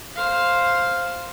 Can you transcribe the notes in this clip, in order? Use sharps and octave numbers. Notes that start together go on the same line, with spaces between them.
C5 F5